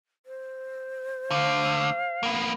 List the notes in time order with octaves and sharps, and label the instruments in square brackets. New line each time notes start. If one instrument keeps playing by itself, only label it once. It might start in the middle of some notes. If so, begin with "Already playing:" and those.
[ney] C5
[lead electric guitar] D2 D3 [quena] F5
[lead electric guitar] A#3 B3